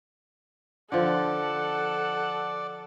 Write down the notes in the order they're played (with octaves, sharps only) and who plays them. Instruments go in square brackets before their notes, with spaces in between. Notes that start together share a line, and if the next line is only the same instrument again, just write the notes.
[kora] D3 F3 [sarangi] A4 [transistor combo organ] D5 [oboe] F#5